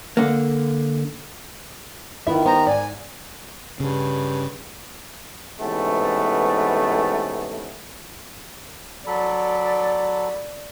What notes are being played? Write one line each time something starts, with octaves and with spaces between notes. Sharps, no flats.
D3 A#3
D#3 B3 E4 F4 E5
B3 G4 C5 A#5
G#2 D5 G#5
G2 C#3
G#2 C3 E3 A3 B3 C#4
F#3 A4 D5 B5